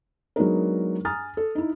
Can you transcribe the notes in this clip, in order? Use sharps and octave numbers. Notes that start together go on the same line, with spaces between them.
F#3 G#3 B3 D4 D#4 A#4
G#5 A#5 D#6 F6 A6
A4
D#4 E4